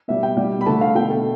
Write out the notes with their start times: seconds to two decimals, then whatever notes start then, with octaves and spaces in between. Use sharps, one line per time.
0.08 B2 G3 E5
0.23 G5
0.37 B2 G3
0.61 B5
0.66 D3 A3 A5
0.81 F5
0.95 B2 A3 G5
1.10 A4